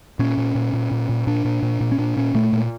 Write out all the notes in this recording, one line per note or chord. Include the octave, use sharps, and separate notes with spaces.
A#2 C#4
A#2
A#2
A#2
A#2
A#2
A#2 D4
A#2
A#2
A#2
C#4
A#2 D4
A#2 C#4
A#2 A3
A#2